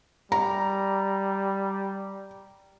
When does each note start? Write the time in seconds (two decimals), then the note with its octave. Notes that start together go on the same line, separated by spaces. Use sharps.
0.32 G3 A#5